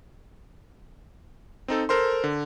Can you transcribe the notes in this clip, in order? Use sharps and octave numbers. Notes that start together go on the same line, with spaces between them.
C4 D#4 A4
A4 A#4 C5 C6
D3